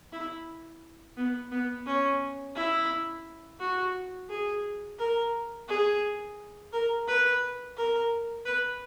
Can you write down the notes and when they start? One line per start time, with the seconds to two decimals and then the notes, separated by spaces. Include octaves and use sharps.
0.13 E4
1.17 B3
1.51 B3
1.86 C#4
2.55 E4
3.59 F#4
4.29 G#4
4.99 A#4
5.68 G#4
6.73 A#4
7.07 B4
7.77 A#4
8.45 B4